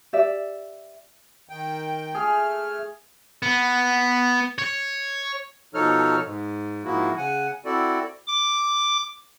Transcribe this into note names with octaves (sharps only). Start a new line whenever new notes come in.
G4 D5 E5
D#3 G5
A3 G#4 F6
B3
C#5
B2 F3 D#4 A4 C#5 F6
G#2
G#2 F3 A#3 E4 F#4
C#3 F#5 G#5
C4 E4 F#4 A4 D5
D6